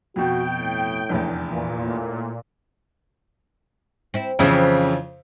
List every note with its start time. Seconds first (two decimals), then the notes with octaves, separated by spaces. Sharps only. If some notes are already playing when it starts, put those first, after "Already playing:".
0.16 F2 B2 F#4 G5
0.58 A2
1.09 F1 A#1 E2
1.50 A#2 E3
1.81 A2
4.14 C4 E4
4.39 F2 C#3 E3 C4 E4